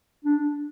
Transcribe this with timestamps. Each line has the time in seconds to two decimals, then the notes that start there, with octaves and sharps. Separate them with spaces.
0.25 D4